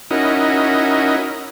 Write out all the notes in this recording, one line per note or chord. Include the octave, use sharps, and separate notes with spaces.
C#4 D#4 E4 F#4 A#4 D#5